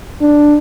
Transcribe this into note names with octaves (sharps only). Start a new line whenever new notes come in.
D4